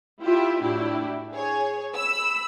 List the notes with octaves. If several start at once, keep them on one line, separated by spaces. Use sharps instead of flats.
E4 F4 G4 E5
A2 D4 E4 F#4 G4
G#4 C#5
B5 E6